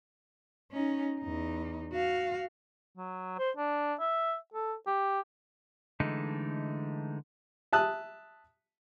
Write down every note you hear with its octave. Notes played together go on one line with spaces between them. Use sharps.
C#4 D#4
E2 D#4
F#4 F5
F#3
C5
D4
E5
A4
G4
D3 E3 G#3 A3 D#4
E5 A5 D#6 F#6